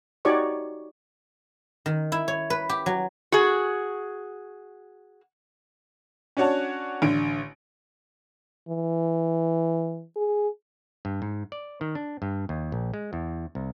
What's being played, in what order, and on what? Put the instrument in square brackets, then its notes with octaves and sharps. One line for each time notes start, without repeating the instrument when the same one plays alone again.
[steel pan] D#4 F#4 G4 C#5 D5 C#6
[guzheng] D#3
E4
C#5
B4
G4
F#3
[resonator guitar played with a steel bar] F#4 G#4
[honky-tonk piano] C#4 D4 F#4 C#5 F#5 A5
A1 D3 D7
[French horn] E3
G#4
[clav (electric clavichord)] G2
G#2
D5
D#3
D4
G2
D#2
A#1
G#3
E2
C2